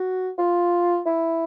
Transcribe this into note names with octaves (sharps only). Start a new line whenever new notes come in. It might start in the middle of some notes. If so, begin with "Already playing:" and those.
Already playing: F#4
F4
E4